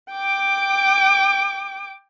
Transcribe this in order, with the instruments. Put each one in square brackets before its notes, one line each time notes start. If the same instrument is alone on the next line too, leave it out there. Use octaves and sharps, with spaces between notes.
[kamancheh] G5 D6